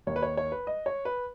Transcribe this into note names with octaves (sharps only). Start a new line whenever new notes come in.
D#2 D#3 C#5
B4
C#5
C#5
B4
D#5
C#5
B4